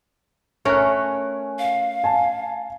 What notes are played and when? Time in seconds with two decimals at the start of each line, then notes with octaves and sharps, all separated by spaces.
0.65 A3 C#4 A#4 G#5 F#6
1.59 F5
2.04 G#5 A5